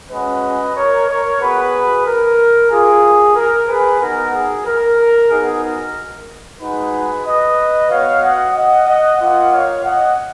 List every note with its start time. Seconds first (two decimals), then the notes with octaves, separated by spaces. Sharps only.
0.11 G#3 C#4 F#4 B4 D#5
0.76 A#4 C#5
1.08 A#4 C#5
1.41 B3 F#4 G#4 B4
2.06 A#4
2.71 A#3 F4 G#4
3.36 A#4
3.68 G#4 B4
4.01 B3 D#4 F#4 A#4
4.34 G#4
4.66 A#4
5.31 B3 D#4 F#4 G#4
5.63 A#4
6.60 G#3 D#4 F#4 G#4 B4
7.25 B4 D#5
7.90 B3 F#4 C#5 F5
8.23 D#5 F#5
8.55 D#5 F#5
8.88 D#5 F#5
9.20 A#3 F4 D#5 F#5
9.52 C#5 F5
9.85 D#5 F#5